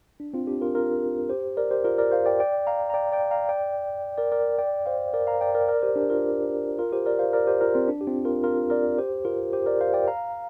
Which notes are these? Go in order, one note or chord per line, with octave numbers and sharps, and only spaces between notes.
D4
C4 F4
D4 G4
F4 A#4
F4 A#4
G4 C5
A#4 D5
G4 C5
F4 A#4
A#4 D5
C5 F5
D5 G5
D5 G5
F5 A#5
A#5
D5 G5
D5 G5
F5 A#5
D5 G5
A#4 D5
A#4 D5
D5 G5
C5 F5
A#4 D5
F5 A#5
D5 G5
A#4 D5
A#4 D5
G4 C5
D4 G4
F4 A#4
F4 A#4
G4 C5
A#4 D5
C5 F5
A#4 D5
G4 C5
F4 A#4
C4 F4
D4
G4
C4 F4
F4 A#4
F4 A#4
A#4 D5
G4 C5
F4 A#4
G4 C5
A#4 D5
C5 F5
D5 G5
F5 A#5